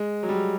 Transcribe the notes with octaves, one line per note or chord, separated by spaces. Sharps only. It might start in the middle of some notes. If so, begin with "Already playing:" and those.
Already playing: G#3
F#3
G3